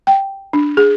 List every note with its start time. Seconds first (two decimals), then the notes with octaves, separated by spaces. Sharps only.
0.07 G5
0.53 D4
0.77 G#4